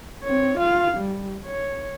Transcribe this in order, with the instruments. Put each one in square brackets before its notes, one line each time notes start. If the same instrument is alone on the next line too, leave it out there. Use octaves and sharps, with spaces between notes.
[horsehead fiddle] C4 C#5
F4 F5
G3
C#5